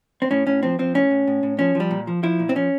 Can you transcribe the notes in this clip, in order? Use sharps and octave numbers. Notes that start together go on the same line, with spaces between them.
C4
A2 C#4
A2 C#4
F3 C4
F3 C4
A2 C#4
A2
A2
A2
F3 C#4
F3
G3
A#2
F3
F3 E4
A#2
C4
F3 C#4